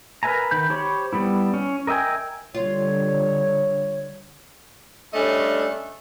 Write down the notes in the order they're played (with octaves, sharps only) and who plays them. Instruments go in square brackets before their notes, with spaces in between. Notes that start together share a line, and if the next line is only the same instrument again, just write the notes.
[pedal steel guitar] A#4 B4 E5 G#5 A#5
D#3 B5 G6
G4 C5 C#5 B5 C#6
G3 B3 E4
C#4
A#4 D#5 E5 G5 G#5
[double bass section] D3 G3 [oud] F4 [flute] C#5
[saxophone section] G3 A3 C#4 D4 D#5